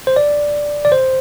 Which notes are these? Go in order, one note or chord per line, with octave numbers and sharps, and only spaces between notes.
C5
D5
D5
C5